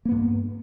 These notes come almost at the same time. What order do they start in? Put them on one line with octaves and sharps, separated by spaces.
A#3 B3 G2